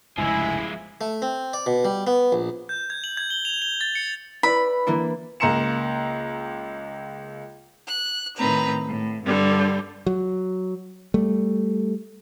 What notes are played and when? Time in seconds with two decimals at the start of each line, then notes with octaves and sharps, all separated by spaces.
0.18 F1 C#2 G2 F3 G#3 E4 G#5
1.01 A3
1.22 C4
1.53 D5
1.66 B2
1.85 G3
2.07 B3
2.32 A#1
2.69 G6
2.90 G#6
3.04 F#7
3.17 G#6
3.30 G7
3.45 F7
3.62 G7
3.81 A6
3.95 C#7
4.43 E4 B4 D5 B5
4.87 E3 A#3 D4
5.40 C#2 A#3 A#5 C6 C#7 E7
7.87 F#6
8.36 A2 D#3 C4 B4 A#5
8.87 A2
9.23 G2 D3 G3
10.06 F#3
11.14 G3 A3